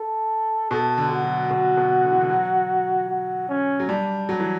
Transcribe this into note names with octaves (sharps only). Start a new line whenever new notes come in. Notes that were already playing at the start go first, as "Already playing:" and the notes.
Already playing: A4
B2 A4
D3
F#4
F#3
B2
B2
D3
E3
D3
F#3
F#4
C#4
F#3
G3 D4
F#3
E3